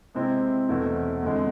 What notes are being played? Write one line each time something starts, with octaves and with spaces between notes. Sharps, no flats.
C3 G#3 C4 E4
E2 B2 A3 C4 E4
F2 D3 G#3